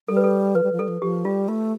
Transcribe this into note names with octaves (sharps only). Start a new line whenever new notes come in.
G3 A4
B4
A4
F3 B4
G3
F3
G3 A4
F3
F3 G4
G3 F4
A3 F4